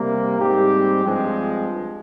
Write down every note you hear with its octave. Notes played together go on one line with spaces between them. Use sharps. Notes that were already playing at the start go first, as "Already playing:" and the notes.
Already playing: C3 G3 A#3
G#2 G3 C4 G4
G2 F3 G#3 C4